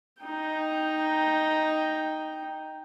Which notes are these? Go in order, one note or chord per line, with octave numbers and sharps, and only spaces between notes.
D#4 G5